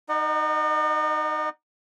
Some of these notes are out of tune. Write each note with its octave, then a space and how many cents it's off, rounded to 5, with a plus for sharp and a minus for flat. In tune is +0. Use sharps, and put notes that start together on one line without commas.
D#4 +0 D#5 -40 F#5 +0